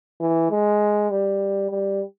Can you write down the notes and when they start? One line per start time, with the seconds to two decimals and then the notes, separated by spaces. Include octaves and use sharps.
0.20 E3
0.51 G#3
1.10 G3
1.71 G3